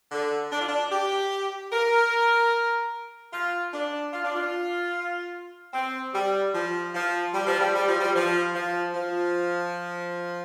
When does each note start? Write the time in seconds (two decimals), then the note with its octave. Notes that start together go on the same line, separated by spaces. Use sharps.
0.11 D3
0.51 D4
0.61 F4
0.68 D4
0.91 G4
1.71 A#4
3.32 F4
3.72 D4
4.13 F4
4.24 D4
4.34 F4
5.73 C4
6.14 G3
6.53 F3
6.94 F3
7.34 G3
7.47 F3
7.60 G3
7.75 G3
7.87 F3
8.00 G3
8.15 F3
8.54 F3
8.94 F3